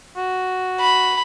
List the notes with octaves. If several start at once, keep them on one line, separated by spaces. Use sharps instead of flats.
F#4
B5